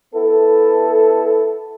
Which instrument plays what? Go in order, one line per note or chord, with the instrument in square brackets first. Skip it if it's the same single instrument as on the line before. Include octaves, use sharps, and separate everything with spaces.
[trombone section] B3 E4 A4